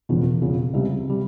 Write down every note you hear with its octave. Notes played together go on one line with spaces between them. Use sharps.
E1 E2 C#3 F3
E1 E2 C#3 F3
C#2 C3 G3
C3 G3